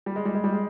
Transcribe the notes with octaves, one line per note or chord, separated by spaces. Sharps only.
G3
G#3
G3
G#3
G3
G#3